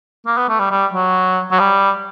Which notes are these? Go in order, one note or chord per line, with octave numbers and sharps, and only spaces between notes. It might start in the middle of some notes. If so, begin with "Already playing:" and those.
A#3
B3
A3
G3
G3
F#3
F#3
G3